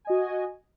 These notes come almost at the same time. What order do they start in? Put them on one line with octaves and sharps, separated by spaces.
G#5 D#5 F#4